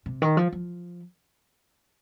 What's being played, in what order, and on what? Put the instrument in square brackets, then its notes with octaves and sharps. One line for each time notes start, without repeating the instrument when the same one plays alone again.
[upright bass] C3
D#3
F3
F3